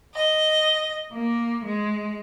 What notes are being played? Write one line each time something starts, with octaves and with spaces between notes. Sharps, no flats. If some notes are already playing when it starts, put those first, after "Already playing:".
D#5
A#3
G#3